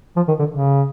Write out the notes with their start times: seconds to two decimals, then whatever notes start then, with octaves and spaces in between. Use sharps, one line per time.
0.16 F3
0.28 D#3
0.39 D3
0.51 C#3